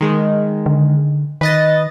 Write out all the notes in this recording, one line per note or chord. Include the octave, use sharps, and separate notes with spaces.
D#3 G#3
D3
D#3 B4 D#5 A6